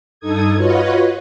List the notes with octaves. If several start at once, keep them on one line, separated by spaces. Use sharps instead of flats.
G2 D#4 A4 D#6 G#6
F4 F#4 B4 C#5 D#5